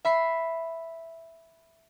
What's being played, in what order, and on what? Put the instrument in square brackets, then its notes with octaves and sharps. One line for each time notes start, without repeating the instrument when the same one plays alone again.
[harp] E5 B5 C7